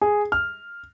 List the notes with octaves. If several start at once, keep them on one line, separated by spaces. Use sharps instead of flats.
G#4
F6